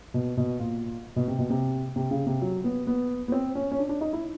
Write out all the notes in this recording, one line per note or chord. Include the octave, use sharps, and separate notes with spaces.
B2
B2
A#2
B2
C3
B2
C3
C3
C#3
C3
F#3
B3
B3
B3
C4
C#4
C#4
D4
D4
D#4
E4